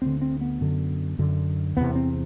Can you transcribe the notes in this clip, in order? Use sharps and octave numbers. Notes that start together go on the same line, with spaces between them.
D2 D3 C4
C4
B3
F#2 D3
F#2 D3
E2 C3 B3
C4